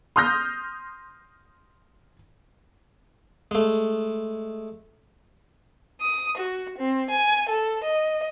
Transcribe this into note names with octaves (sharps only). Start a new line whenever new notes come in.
C6 D#6 F6 G6 A#6
G#3 A3
D#6
F#4
C4
G#5
A4
D#5